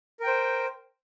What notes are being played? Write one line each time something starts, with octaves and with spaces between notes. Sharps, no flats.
A#4 C5 G5